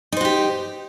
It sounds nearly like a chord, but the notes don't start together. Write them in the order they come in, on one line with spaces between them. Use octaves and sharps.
D#4 C5 F#4 G4